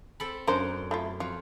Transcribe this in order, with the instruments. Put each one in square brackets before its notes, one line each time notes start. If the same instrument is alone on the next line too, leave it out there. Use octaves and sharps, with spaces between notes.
[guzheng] C4 A4 B5
[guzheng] F#2 [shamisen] D4 A#4 C5
[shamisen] A3 E4 F4
[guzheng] F2 [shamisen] F4